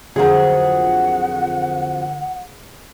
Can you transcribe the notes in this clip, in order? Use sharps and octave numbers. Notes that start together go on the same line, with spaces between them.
F2 D3 F3 F#3 F4 G#4 A#4 F#5